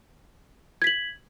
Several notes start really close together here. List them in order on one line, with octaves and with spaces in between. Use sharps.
G#6 B6 F#7